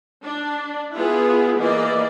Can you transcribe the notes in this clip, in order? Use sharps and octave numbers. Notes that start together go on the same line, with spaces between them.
D4
B3 E4 F4 G#4
E3 A#3 D5 D#5